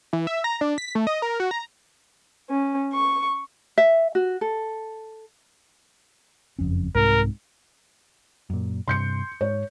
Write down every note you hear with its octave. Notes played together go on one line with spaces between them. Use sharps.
E3
E5
A#5
D4
B6
A3
D#5
A#4
F#4
A#5
C#4
C#6
E5
F#4
A4
F#1 F2 C#4
C2 G#2 C3 A#4
F#2 A#2
G2 C3 C6 G6 C#7
G#2 C#5